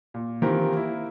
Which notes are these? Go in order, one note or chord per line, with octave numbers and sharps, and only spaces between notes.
A#2
D#3 E3 C4 F4 G4 A#4
A#3 E4